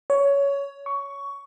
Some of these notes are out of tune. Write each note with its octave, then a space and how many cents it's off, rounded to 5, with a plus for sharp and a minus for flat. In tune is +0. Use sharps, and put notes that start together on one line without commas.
C#5 +15
C#6 +15